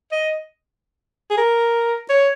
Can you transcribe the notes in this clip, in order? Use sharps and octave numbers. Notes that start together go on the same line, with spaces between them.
D#5
G#4
A#4
C#5